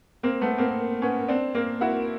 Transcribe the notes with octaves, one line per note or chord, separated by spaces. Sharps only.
A#3 C4
A3 B3
A#3 C4
B3 C#4
C4 D4
A#3 C4
E4 F#4